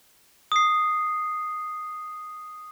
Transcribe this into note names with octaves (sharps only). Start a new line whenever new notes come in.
D#6 C7